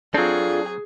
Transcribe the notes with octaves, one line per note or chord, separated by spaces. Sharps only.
F#3 C4 D4 F4 G#4 A4